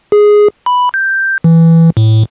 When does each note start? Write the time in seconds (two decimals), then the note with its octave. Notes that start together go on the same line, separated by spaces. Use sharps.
0.12 G#4
0.66 B5
0.94 G6
1.44 E3
1.97 A2